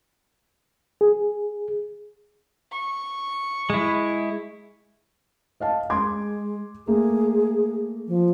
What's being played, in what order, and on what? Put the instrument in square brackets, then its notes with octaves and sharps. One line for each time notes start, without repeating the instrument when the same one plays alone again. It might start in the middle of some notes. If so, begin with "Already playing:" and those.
[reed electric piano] G#4
[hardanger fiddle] C#6
[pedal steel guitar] G#3 E4
[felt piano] D#5 F5 A5
[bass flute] G#3 [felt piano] C6 D6 G#6
[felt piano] A3 A#3 [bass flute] G#4
[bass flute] F3